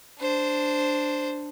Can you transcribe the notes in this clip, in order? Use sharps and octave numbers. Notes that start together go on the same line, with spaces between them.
D4 C5